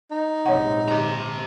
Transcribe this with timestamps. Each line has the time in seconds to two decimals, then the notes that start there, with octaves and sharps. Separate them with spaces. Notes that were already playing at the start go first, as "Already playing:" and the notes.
0.11 D#4
0.46 A#1 G#2 C3 C#5 F#5
0.88 G4 A#5